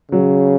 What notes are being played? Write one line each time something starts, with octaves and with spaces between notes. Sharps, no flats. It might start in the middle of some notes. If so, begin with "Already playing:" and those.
C#3 F#3